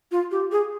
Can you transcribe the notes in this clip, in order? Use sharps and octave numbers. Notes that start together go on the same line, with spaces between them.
F4
G4
G#4